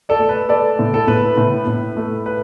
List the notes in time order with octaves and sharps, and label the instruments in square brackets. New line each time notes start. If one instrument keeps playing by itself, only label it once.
[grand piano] A4 D5
A3
B4
A3 A4 D5
A2
A4
A2 B4
A2
A2
A3
B4